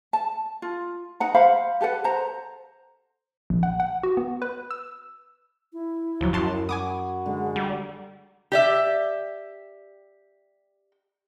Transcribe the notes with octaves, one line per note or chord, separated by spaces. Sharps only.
A5
F4
D#4 F#5 A#5
C5 F5 F#5 B5
G4 A4 B4 F#5
C5 A#5
A#1
F#5
F#5
F#4
B3
B4
E6
E4
D2 F3 F#3
F#2 F#4 A5 C6
F#4 G#5 B5 D6 D#6
D3 G#3
G3 A#5
G4 D5 E5